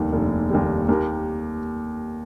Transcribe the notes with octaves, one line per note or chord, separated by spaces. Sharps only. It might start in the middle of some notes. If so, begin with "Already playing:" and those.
Already playing: F1 D#2 D#3 G3
F1
D#2 D#3 G3
D#2 G4 A#4